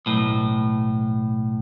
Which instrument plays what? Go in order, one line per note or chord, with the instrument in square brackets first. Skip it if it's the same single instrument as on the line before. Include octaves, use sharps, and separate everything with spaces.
[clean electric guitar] B1 A2